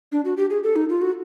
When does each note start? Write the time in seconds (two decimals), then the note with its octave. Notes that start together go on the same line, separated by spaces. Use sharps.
0.12 D4
0.25 F#4
0.37 G4
0.50 G#4
0.64 A4
0.76 D#4
0.89 F4
1.02 F#4